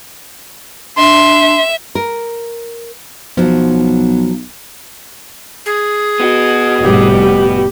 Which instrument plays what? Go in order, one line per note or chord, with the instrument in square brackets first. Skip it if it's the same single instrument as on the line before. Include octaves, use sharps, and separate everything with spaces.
[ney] D4 [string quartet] E5 [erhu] C6
[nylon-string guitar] A#4
[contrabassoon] B1 [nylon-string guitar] F3 F#3
[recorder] G#4
[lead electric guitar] B3 F#4
[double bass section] F1 A2 G3 [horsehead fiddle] G4